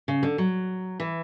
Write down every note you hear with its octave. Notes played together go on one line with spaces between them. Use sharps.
C#3
D3
F#3
E3